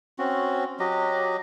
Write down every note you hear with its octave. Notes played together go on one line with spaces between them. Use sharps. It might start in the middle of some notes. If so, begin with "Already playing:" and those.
C4 C#4 F#4
F#3 G4 D#5